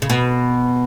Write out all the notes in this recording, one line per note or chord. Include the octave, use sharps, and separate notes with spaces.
C#3
B2